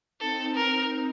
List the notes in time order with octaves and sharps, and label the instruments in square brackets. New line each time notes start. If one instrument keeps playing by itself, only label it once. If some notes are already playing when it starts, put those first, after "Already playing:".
[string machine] C4 D#4 [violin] A4
[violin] A#4